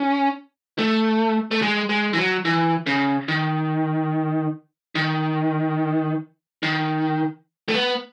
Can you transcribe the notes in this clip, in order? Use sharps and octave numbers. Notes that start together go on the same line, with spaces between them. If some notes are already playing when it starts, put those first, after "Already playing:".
Already playing: C#4
A3
A3
G#3
G#3
E3
F#3
E3
C#3
D#3
D#3
D#3
A3
B3